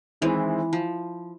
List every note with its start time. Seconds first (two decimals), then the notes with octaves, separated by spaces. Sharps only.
0.21 D#3 E3 G#3 C4 E4
0.73 F3